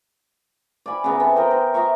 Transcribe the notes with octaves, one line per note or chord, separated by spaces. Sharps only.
D5 F5 G#5 B5
C#3 B3 E5 A#5
B3 C4 A4
A#4 B4 D#5 G5
A#4 C5 E5
D#5 E5 A#5 C#6